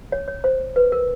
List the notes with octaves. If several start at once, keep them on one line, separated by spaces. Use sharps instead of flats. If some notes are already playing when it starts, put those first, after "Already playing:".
C#5
C#5
C5
B4
A#4